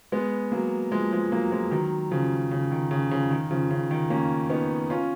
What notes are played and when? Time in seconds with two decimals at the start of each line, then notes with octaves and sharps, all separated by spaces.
0.12 G#3 B3
0.52 F#3 A#3
0.92 F3 G#3
1.12 F3 G#3
1.32 F#3 A#3
1.52 F3 G#3
1.71 D#3 F#3
2.11 C#3 F3
2.51 C#3
2.71 D#3
2.91 C#3
3.11 C#3 F3
3.31 D#3
3.51 C#3 F3
3.71 C#3
3.91 D#3
4.10 A#3 C#4
4.50 B3 D#4
4.90 C#4 F4